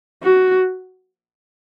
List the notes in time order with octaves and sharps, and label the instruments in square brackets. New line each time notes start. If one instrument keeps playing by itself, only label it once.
[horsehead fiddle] F#4